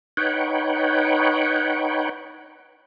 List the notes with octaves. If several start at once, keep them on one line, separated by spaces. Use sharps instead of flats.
D#4 B4 C#5 F#5 G5